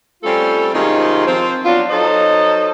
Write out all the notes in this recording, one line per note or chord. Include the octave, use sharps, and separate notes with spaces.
G3 A3 C4 C#4 F4 A4
C3 D#3 G#3 C#4 D#4 F4
F3 C4
F#3 B3 D4 F4
F#3 D#4 A4 C5 D#5